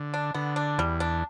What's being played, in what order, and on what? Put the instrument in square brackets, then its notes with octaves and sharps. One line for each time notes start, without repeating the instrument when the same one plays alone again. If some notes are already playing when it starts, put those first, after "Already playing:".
Already playing: [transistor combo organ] D3
[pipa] D4
[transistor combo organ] D3 [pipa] B3
[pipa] D4
[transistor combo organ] E2 [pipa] G3
[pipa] D4